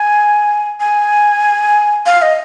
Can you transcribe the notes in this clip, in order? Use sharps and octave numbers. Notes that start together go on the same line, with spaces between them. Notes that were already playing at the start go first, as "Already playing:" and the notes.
Already playing: G#5
G#5
F5
D#5